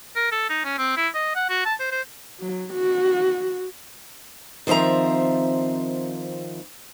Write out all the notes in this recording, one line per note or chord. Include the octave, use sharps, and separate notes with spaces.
A#4
A4
D#4
C#4
C4
E4
D#5
F#5
F#4
A5
C5
C5
F#3
F#4
D#3 F3 C4 E5 A#5